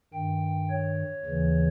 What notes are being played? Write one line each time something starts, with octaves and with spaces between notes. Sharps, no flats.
G2 D#3 G5
C#5
D#2 C#3 E3